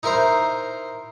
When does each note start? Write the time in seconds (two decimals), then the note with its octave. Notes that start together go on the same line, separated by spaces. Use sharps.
0.03 D#4 E4 A#4 C5 A#5